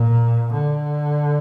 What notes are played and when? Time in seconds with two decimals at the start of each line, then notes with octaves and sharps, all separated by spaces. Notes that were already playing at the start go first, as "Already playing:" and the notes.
Already playing: A#2
0.54 D3